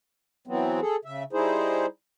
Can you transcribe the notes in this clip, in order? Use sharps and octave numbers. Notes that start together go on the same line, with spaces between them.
E3 F#3 B3 C4
G#4 A4
C#3 E5
G3 D#4 E4 G#4 C5